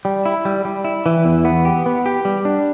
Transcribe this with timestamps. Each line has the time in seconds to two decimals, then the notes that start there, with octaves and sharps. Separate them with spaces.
0.05 G3
0.26 E4
0.45 G3
0.65 G3
0.85 E4
1.06 E3
1.25 E2
1.45 B3
1.65 G4
1.86 B3
2.06 G4
2.25 G3
2.45 D4